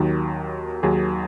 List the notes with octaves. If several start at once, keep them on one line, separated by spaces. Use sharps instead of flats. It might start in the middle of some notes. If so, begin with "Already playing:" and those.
Already playing: D#2 D#3 F#3
D#2 D#3 F#3 G#4